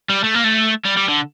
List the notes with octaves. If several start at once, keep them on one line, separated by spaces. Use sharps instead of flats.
G3
A3
A#3
A3
G3
G3
D3